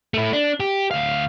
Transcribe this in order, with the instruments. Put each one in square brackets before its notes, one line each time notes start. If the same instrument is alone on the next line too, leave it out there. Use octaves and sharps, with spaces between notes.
[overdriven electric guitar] A3 E4
D4
G4
D2 F5